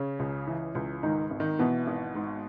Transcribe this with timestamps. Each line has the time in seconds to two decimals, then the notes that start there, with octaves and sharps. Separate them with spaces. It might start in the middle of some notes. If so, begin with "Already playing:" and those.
Already playing: C#3 C#4
0.19 C#2
0.47 E3
0.75 C#2
1.03 G#2 D#3 D#4
1.30 G#1
1.40 D#3 D#4
1.59 B2 E3 B3
1.87 G#1
2.15 G#2